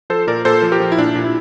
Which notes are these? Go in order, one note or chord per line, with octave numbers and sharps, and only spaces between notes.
F3 A4 C5
A#2 A#4 D5
A#2 A4 C5
F3
G4 A#4
F3
E4
A#2 D4
A#2
E4